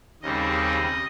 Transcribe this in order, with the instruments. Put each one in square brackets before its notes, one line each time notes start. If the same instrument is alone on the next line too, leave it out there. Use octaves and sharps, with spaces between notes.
[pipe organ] D#2 C#3 G3 C4 D#5